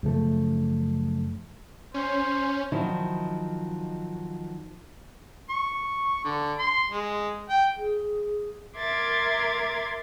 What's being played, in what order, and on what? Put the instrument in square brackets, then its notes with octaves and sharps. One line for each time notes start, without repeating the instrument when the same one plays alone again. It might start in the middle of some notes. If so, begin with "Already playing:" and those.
[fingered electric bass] F#2 C#3 F3 A3
[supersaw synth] C#4 [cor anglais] C5
[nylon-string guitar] D#3 F3 F#3 D#4 E4
[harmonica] C#6
D3
C6
G#3
G5
[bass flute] G#4
[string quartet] A#4 E5 C6 D6 G#6 A6